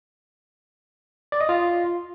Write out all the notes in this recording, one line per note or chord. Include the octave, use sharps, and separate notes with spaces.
D5
D#5
F4